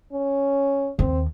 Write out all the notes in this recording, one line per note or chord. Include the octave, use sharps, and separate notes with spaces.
C#4
D#2 C4